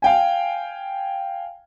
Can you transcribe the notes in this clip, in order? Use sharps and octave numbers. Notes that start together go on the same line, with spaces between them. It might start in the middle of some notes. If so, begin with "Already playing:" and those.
F5 G5 G#5